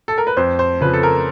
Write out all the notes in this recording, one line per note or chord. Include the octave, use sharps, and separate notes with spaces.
A4
A#4
B4
F2 C5
C5
C#3 F3 B4
A4
A#4